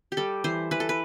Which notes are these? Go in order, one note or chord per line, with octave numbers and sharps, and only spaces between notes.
G4
G3 A4
E3 C5
E3 B4
A4
B4